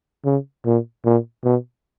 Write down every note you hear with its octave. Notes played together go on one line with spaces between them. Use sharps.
C#3
A#2
A#2
B2